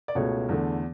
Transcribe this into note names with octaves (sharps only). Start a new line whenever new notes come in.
D5
C#2 B2 A3 C#5
E2 D3 A3